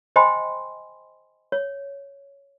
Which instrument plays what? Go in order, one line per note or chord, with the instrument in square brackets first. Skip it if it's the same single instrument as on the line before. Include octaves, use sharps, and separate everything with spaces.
[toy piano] C5 D#5 G5 G#5 B5 C6
C#5